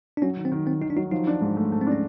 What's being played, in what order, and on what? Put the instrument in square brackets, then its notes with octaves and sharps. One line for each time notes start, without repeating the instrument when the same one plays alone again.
[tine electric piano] D4
[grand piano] F#3 [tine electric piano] C#4
[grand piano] D#3
[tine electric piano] C4
[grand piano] D#3
[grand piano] D#3 [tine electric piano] C4
[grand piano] D#3 [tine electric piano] D#4
[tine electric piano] D4
[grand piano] F#3 [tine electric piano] D#4
[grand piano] F3 [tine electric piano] D#4
[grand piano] D4
G#2
A3
A3
[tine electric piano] C4
[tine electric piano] C#4 [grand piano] D4